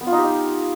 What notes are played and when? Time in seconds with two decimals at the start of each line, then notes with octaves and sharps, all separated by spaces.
0.01 B3
0.07 F4
0.12 D#4
0.18 G4
0.24 D#4